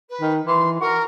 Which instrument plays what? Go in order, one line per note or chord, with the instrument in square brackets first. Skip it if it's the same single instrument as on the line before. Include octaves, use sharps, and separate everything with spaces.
[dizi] B4
[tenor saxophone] D#3
[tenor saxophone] E3 [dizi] C6
[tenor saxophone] F#4 [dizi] A#4